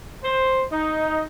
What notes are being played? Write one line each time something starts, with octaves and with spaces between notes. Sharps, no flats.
C5
D#4